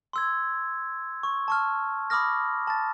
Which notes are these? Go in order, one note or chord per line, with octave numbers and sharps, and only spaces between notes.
C6 E6 G#6
C#6
A5 C#6 F6
B5 D6 D#6 F6 A#6
A5 A6